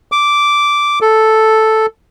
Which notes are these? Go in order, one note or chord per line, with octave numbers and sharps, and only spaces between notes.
D6
A4